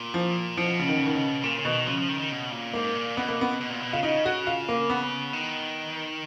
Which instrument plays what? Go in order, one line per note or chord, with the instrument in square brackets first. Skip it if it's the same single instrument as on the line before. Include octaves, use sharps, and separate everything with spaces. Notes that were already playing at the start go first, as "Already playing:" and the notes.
Already playing: [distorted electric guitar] A#2
[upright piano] F3
[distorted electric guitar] B2 [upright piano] F3
[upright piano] C#3
D#3
C#3
D#3
C#3
[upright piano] A#2 [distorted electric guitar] C#3
[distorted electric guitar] C#3
[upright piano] B2 [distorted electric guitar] D#3
[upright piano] C#3 [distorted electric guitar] F3
[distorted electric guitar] F3
D#3
D#3
B2
A#2
[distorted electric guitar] G#2 [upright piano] A#3
[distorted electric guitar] A#2
[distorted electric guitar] B2 [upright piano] B3
[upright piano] A#3
B3
[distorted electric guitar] B2
A#2
B2
[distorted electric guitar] C#3 [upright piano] F4
[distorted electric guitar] C#3 [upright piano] D#4
[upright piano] F#4
F4
A#3
B3
[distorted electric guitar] D#3